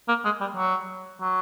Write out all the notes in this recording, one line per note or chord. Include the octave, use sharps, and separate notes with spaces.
A#3
G#3
G3
F#3
F#3